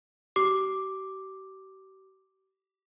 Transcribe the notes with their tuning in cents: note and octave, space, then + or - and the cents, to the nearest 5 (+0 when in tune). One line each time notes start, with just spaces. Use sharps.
G4 -45 D6 +0